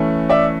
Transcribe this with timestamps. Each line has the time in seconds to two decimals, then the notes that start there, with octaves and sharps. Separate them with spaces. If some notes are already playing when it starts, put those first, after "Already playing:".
Already playing: E3 A3 C#4
0.29 D5 E5